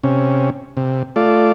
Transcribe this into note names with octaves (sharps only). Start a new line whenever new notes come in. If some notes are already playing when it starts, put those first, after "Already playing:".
C3 C#4
C3
A3 F4 D5